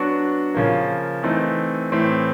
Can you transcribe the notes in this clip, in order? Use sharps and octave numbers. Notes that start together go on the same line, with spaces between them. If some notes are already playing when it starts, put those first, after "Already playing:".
Already playing: F#3 B3 D4 F#4
C#3 F3 A#3
E3 A3 C4 D#4
A2 E3 A3 C4